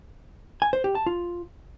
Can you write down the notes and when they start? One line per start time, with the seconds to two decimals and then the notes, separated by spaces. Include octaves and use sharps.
0.62 G#5
0.73 C5
0.84 G4
0.95 A5
1.06 F4